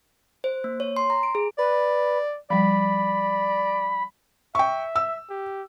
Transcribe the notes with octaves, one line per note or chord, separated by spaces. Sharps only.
C5
A#3
C#5
C6
A#5
D7
G#4
B4 D5
F3 G3 D5 B5
E5 G5 C#6
E6
G4